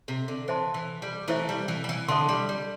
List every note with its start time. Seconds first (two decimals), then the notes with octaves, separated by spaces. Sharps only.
0.08 C3
0.28 D3
0.48 E3 C5 E5 A5 C6
0.74 E3
1.02 G3
1.28 E3 A3 E4 C5 E5
1.49 G3
1.68 E3
1.84 G3
1.89 E3
2.08 D3 A4 E5 A5 C6
2.29 G3
2.49 G3